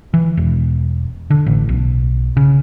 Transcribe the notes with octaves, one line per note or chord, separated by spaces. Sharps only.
E3
E1
D3
A1
B1
C#3